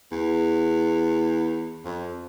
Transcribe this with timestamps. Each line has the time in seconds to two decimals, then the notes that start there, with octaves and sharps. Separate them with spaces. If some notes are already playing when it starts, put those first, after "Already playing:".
0.12 E2
1.85 F2